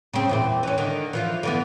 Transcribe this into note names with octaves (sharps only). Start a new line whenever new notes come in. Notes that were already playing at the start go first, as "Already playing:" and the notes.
C#3 C4
E2 A#2 C4
E3 C#4
D3 D#3
E3 F3 F4
D3 E3 B3